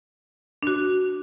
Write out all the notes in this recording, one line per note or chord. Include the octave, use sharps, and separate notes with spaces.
D4 F#4